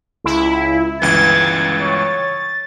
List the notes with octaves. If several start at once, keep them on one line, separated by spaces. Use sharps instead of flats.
C#2 E4
G1 C#2 E3 G#6 A6
C#5